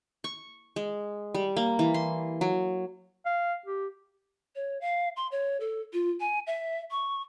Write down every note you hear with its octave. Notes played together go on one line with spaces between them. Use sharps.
C#6
G#3
G3
A#3
E3
C6
F#3
F5
G4
C#5
F5
C6
C#5
A4
F4
G#5
E5
C#6